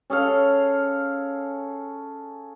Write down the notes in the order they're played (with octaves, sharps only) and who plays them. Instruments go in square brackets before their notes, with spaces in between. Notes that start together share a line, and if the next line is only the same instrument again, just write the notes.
[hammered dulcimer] C#4 G#4 A4 F5